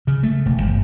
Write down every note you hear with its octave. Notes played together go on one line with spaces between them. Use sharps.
C#3
A3
E1
G1